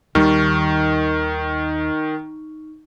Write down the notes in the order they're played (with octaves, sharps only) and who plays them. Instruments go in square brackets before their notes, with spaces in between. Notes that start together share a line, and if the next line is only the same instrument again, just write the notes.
[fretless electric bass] D#2 G3 [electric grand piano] D#3 [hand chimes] D#4 C#6 F6